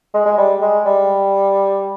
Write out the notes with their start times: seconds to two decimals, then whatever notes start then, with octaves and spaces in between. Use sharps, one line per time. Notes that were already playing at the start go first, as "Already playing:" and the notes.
0.14 G#3
0.26 G#3
0.38 G3
0.62 G#3
0.86 G3